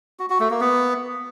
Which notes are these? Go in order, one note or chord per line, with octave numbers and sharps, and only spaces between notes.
F#4
F#4
A3
A#3
B3